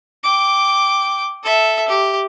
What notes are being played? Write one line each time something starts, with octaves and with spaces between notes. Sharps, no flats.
G5 D6
A4 E5
G4